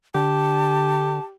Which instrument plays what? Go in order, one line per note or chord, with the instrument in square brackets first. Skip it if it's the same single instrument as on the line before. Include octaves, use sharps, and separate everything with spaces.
[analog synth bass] D3 [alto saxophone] G4 [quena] A5